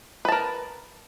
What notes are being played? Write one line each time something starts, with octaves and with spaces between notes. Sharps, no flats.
A#4 B4 A5